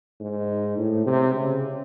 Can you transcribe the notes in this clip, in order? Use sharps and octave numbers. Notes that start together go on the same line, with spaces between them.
G#2
A2
C3
C#3